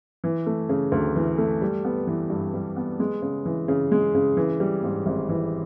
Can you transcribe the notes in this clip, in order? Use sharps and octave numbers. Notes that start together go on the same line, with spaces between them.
E3
A3
C#3
D2
E3
A3
G3
B3
E3
G2
G3
B3
G#3
C#3
E3
C#3
G#3
C#3
E3
G3
G#2
G#1
E3